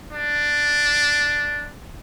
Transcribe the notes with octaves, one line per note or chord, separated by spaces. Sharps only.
D4